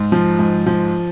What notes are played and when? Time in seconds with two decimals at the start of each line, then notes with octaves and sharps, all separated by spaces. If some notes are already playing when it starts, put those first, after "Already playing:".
Already playing: G#2
0.12 F3
0.39 G#2
0.66 F3